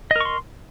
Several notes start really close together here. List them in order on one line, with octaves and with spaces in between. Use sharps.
D#5 A#4 C#6 C6